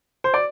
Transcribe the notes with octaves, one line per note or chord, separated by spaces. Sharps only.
C5
D5